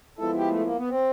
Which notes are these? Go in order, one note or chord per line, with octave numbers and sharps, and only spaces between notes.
F3 G#3 B3 E4 A4
G4
A3
A#3
B3
C4